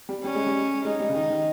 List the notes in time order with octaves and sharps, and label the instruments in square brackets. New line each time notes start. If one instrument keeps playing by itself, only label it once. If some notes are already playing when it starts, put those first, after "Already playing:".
[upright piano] G3
[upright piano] G3 [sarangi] C#4
[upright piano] G#3
G3
[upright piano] G#3 [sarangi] D#4
[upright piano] G3
C#3
[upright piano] D#3 [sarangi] D#4
[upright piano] D#3